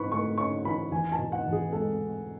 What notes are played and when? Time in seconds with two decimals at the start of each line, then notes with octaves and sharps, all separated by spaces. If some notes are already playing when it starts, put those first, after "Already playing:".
Already playing: G#2 E3 B4 B5 C#6
0.12 A3 C#6
0.38 C#4 C#6
0.65 E3 B5
0.92 E2 G#5
1.12 A5
1.18 B2
1.32 F#5
1.46 E2
1.52 G#4
1.73 G#3 A4